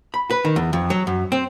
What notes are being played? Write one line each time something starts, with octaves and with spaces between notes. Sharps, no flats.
B5
B4
D#3
E2
F2
F#3
F#2
C4